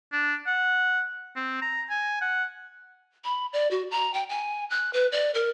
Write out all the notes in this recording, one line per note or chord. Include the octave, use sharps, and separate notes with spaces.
D4
F#5
C4
A#5
G#5
F#5
B5
D5
F#4
A#5
G5
G#5
F#6
B4
D5
A#4